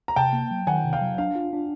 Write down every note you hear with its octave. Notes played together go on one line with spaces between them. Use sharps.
A#5
C3 G5 A5
A#3
F#3
D#3 F#5 G#5
C3
F5 G5
F#3
D4 F5
F4
D4